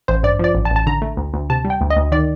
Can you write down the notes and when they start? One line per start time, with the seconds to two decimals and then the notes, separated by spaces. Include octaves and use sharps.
0.08 A1 C5
0.23 G2 D5
0.39 F3 D5
0.55 A1
0.65 A5
0.70 A1
0.76 A5
0.86 D3 A#5
1.02 A3
1.17 D2
1.34 D2
1.50 C3 A5
1.65 G3
1.70 G5
1.81 D2
1.90 D#5
1.96 D2
2.12 D#3 D5